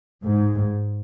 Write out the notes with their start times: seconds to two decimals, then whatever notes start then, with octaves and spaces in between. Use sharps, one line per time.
0.24 G#2